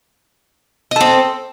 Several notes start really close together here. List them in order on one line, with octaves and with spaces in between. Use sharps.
D#5 A4 C4